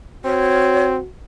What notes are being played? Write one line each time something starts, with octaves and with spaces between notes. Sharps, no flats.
C4 F#4 C#5